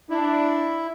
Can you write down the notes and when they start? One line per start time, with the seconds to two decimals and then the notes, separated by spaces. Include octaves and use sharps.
0.10 D4 E4